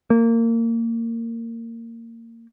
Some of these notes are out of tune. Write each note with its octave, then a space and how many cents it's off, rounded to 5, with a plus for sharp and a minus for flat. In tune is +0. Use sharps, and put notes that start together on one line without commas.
A#3 -25